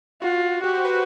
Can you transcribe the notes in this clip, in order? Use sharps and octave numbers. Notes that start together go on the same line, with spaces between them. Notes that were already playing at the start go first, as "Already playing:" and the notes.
F4 F#4
F#4 G4
C5
B4